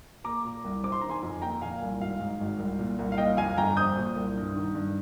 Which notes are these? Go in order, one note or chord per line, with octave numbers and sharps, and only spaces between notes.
A#3 A#5 D6
A#2
C2
C4 D6
C6
D#3 A#5
G#5 C6
F2
A#3 G5 A#5
A#2 F5 G#5
C2
G#1 F5
G#2
G#1
C2
A#2
C2
F5
A#3 D#5 G5
F2 F5 G#5
G1 G5 A#5
C4 D#6 G6
A#2
C2
G2
D#3
G2